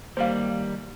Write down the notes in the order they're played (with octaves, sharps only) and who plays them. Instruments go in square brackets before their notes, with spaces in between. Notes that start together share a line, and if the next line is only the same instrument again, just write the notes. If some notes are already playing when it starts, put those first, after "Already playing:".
[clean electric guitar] D#2 G3 A#3 [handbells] C5 F5